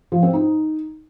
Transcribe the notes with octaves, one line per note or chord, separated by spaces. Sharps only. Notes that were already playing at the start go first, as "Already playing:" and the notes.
F3
C4
D#4